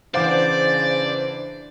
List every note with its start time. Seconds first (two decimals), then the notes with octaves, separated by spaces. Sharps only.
0.14 C#3 E3 D4 C5 D5 F5 F#5 D6